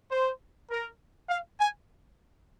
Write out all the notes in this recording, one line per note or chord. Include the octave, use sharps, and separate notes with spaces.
C5
A#4
F5
G#5